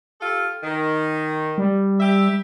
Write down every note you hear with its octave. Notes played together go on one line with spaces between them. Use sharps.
F4 G4 A4
D#3
G3
G4 E5